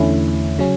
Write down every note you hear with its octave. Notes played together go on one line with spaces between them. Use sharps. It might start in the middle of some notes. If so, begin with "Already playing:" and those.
Already playing: E2 D3 A3 C#4 E4
C#3 F#3 C#4